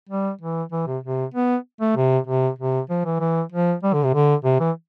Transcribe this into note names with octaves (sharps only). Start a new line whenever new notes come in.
G3
E3
E3
C3
C3
B3
A3
C3
C3
C3
F3
E3
E3
F3
G3
D3
C3
D3
C3
E3